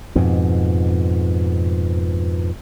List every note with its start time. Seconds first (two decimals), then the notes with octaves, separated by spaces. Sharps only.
0.15 F2 G#2 B2